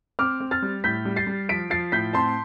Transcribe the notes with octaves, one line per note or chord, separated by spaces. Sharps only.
C4 D6 F6
C4
F6 A6
G3
A2 G6 B6
G3
A6 C7
G3
F3 B6 D7
F3 A6 C7
A2 G6 B6
C4 A5 C6